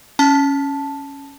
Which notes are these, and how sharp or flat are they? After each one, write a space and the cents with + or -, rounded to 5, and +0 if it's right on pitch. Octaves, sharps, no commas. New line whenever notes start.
C#4 +0 A5 +0